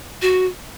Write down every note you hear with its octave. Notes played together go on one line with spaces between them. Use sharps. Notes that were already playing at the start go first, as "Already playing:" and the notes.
F#4